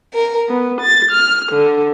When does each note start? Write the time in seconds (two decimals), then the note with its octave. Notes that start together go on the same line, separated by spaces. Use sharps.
0.13 A#4
0.49 B3
0.81 A6
1.12 F6
1.54 D3